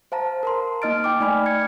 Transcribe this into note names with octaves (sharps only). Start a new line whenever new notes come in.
C5 F5 A5 A#5
A#4 A#5 C6
A#3 D#4 D#5 F6 A6 D7
D#4 G5 D6
A3 D#4 D5 G#5 B5 F6
F6 G#6 C#7